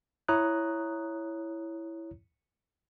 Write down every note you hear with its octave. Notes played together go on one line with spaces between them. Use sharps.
E4 C#5 A#5 D#6 F#6